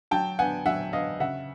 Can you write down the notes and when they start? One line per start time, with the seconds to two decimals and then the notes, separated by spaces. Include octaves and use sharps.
0.11 F#3 G5 A5
0.39 B3 D4 F#5 G#5
0.66 F#3 E5 F#5
0.93 B3 D4 D#5 F5
1.20 C#3 E5 F#5